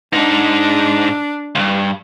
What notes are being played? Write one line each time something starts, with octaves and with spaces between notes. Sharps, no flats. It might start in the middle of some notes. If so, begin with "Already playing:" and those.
G#2 D4 D#4
C#2 G2